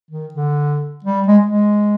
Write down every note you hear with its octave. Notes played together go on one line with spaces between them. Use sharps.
D#3
D3
G3
G#3
G#3